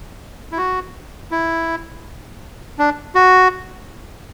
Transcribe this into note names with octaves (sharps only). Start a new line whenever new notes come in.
E4
F#4
E4
D4
F#4